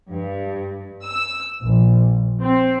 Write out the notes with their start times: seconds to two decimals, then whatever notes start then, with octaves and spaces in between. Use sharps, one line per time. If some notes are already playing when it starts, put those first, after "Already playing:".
0.11 G2
1.02 E6
1.63 A#1
2.41 C4